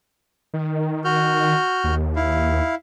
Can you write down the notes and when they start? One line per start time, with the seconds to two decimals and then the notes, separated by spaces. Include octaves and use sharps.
0.54 D#3
1.05 F#4 F6 G6
1.84 D#2
2.16 E4 F5